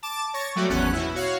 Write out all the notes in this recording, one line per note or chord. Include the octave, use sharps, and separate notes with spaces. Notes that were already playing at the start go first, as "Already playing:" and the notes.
A5 D6
C#5 C#6 A6 A#6
F#3 G3 A3 F#4 G4
G#1 E2 B3 C#4 F#6
B2 E4
F#4 C#5 F5